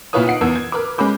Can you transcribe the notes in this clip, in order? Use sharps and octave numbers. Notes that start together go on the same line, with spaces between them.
A#2 E4 F4 B4 C#5 D#6
D#4 F#5 C7 D7
E2 B3 E6 G#6
G#6
A#4 B4 D6
G#3 C#4 B5 D6 G6